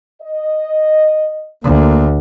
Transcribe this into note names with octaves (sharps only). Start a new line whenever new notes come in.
D#5
D2 A#3